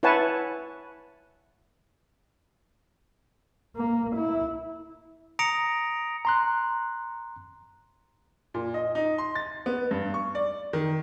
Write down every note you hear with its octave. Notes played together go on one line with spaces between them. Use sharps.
E4 B4 C#5 F#5 G#5 A5
A#3
E4
A#5 D#6 A#6 C#7 D7 F7
A#5 C6 F#6
A#2
D#5
D#4
C6
A6
B3
G2
C#6
D5
D#3